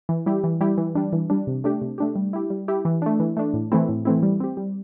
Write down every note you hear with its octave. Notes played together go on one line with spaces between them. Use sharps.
E3
G3 E4 G4
E3
G3 E4 G4
E3
G3 D4
E3
G3 D4
C3
A3 D4 G4
C3
A3 D4 G4
G3
E4 G4
G3
E4 G4
E3
A3 D4
E3
A3 D4
A2
E3 A3 C4 E4
A2
E3 A3 C4 E4
G3
C4 G4
G3